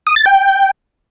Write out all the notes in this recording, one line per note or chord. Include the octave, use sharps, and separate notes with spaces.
D#6
A6
G5